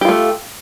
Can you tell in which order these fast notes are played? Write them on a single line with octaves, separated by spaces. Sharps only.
G4 F4 A3